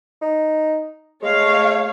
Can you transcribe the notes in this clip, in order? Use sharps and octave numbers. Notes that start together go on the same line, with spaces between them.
D#4
G#3 A3 C#5 F5